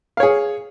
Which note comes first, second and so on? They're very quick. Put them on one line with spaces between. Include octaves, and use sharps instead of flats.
F5 C#5 G#4